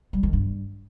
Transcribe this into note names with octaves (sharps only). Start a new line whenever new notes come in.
G3
D#3
G2